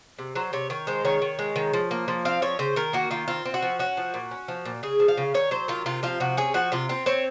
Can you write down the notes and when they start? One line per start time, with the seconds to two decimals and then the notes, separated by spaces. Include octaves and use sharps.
0.19 C3
0.35 F#3 C5
0.53 C3 C#5
0.70 D#3 C#5
0.87 G#3 C5
1.05 D#3 C#5
1.22 D#3
1.39 G#3
1.56 D#3
1.73 F3
1.91 A#3
2.08 F3
2.25 C4 F5
2.42 F3 C#5
2.59 C#3 C5
2.76 D#3 A#4
2.93 A#3 F#4
3.11 D#3 F4
3.28 C4 F4
3.46 C4
3.54 F#4
3.62 F3
3.79 C#4 F#4
3.97 F3
4.14 A#2
4.31 C#4
4.48 F3
4.65 A#2
4.83 C#3 G#4
5.00 F3
5.08 F5
5.17 C#3
5.34 D#3 C#5
5.51 F#3 C5
5.68 D#3 F4
5.86 C3 F4
6.03 F3 F4
6.20 C3 F#4
6.37 C#4 G#4
6.54 F3 F#4
6.72 C3 F4
6.89 C4 F4
7.06 C4 C#5